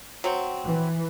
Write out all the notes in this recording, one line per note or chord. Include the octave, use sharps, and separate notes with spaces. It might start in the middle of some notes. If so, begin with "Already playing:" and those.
F#3 C4
E3